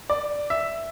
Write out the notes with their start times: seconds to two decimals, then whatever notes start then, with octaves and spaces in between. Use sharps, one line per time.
0.10 D5
0.50 E5